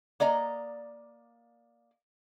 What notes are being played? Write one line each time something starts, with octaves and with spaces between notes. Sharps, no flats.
A#3 D5 D#5 A#5